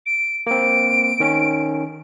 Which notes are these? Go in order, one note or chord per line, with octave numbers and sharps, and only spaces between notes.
D7
A#3 C4 D7
D#3 C#4